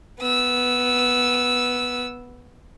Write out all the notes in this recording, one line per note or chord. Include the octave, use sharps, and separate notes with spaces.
B3 E6